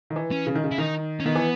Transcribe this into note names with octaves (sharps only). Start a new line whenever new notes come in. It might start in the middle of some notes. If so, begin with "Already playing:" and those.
D#3
E3
C#4
C#3
D#3
C#3
E4
D#3 D#4
C#4
D#3 B3
E3